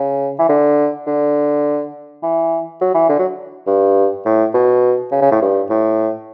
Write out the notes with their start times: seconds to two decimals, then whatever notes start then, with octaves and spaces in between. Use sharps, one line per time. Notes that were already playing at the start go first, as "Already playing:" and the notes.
Already playing: C#3
0.39 E3
0.49 D3
1.07 D3
2.23 E3
2.81 F#3
2.94 E3
3.09 D3
3.19 F#3
3.67 G2
4.25 A2
4.54 B2
5.11 C#3
5.21 C#3
5.31 A2
5.41 G2
5.70 A2